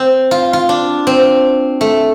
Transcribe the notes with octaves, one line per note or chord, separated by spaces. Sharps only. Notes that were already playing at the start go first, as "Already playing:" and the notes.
Already playing: C4
F4
F4
D4
C4
A3